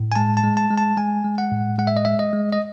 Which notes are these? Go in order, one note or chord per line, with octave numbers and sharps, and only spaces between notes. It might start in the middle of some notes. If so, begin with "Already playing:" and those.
Already playing: A2
G#5
G#3 A5
A5
G#3
A5
G#3
A5
G#3 G#5
G#3
F#5
A2
G#3 F#5
E5
D#5
G#3 E5
D#5
G#3
D#5